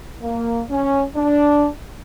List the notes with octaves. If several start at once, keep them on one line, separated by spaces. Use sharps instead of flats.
A#3
C#4
D4